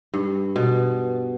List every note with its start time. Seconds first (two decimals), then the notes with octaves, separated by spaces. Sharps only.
0.14 G2
0.56 B2